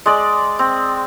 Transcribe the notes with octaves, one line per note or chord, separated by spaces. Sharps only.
G#3 D5
C4